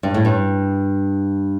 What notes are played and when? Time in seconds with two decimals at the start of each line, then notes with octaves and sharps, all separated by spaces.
0.03 G2
0.14 A2
0.25 G2